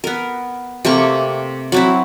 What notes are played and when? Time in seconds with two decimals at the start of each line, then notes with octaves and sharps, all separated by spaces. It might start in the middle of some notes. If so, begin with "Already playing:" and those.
0.04 B3 A#4
0.85 C3 A3 A#3 C#6
1.72 F#3 C4 E4